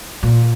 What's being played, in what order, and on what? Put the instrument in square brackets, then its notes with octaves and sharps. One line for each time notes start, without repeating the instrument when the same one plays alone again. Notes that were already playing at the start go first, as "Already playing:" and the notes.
[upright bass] A#2